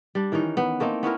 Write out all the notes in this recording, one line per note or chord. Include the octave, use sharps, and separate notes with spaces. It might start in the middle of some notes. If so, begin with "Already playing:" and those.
G3 D4
D#3 E3 C#4 D#4
B3
A3 A#3 C4 D#4
B3 C#4 E4 A#4